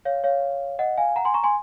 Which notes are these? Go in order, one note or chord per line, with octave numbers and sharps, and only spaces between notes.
C#5 F5
C#5 F5
D#5 F#5
F5 G#5
F#5 A#5
G#5 C6
A#5 C#6
G#5 C6